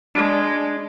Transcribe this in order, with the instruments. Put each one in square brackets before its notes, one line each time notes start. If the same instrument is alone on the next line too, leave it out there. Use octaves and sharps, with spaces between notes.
[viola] G#3 [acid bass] D4